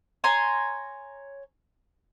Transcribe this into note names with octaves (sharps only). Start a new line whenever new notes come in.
C#5 G#5 A#5 C6